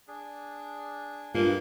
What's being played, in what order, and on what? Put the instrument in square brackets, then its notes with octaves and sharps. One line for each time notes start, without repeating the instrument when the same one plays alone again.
[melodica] D4 G#4
[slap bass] G2 [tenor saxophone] A#3 [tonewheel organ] F4